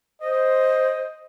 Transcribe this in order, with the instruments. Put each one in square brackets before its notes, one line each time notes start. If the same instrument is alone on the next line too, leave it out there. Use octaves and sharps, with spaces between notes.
[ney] C5 [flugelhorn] D#5